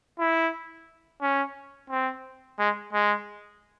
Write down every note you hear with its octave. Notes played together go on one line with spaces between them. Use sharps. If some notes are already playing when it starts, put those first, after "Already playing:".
E4
C#4
C4
G#3
G#3